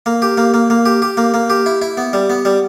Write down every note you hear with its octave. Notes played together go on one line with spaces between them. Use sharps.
A#3
G4
A#3
A#3
A#3
G4
G4
A#3
A#3
G4
E4
E4
B3
G3
B3
G3